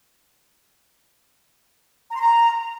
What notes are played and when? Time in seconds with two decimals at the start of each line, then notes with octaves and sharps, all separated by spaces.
2.11 A#5
2.16 C6
2.21 A#5